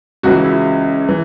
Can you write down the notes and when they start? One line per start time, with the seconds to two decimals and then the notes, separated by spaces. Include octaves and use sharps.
0.23 C#2 C#3 E3 F#4
0.44 E4
1.09 E3